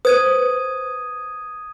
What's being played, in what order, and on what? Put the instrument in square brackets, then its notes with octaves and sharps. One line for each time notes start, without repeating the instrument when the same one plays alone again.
[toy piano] B4 C5 [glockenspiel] D#6 G#6 D#7